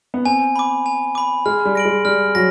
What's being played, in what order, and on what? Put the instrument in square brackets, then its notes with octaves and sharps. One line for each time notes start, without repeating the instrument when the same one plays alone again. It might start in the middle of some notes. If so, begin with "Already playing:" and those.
[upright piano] B3
[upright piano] C4 [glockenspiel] G#5
[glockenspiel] B5 D6
G#5
B5 D6
[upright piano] G#3 [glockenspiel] F6
[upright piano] G3
[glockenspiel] A#6 D7 F#7
[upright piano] G#3
[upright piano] G3 [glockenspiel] F6
[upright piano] F#3 [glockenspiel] A#6